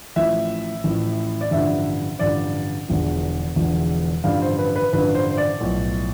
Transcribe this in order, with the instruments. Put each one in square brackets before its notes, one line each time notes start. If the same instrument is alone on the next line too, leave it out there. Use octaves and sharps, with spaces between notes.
[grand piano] A1 A2 F3 E5
A1 A2 F3
D5
A1 G2 D3 F3 E5
A1 G2 D3 F3 D5
E1 E2 D3 F3
E1 E2 D3 F3
A1 G2 D3 F3 F5
C5
B4
B4
A1 G2 D3 F3 B4
C5
C5
D5
B1 A2 F3